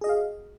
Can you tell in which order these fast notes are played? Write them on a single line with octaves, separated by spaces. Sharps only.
G#4 D#5 F#4 F5